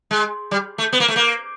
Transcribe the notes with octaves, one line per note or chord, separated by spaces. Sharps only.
G#3
G3
A3
B3
A#3
A3
A#3